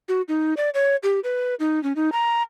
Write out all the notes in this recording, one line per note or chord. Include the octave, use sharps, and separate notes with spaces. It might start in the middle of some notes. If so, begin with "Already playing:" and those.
F#4
D#4
D5
C#5
G4
B4
D#4
C#4
D#4
A#5